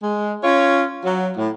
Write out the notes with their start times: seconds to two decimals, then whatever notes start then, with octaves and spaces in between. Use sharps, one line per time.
0.01 G#3
0.42 C#4 F4 C#5
1.04 F#3
1.36 A2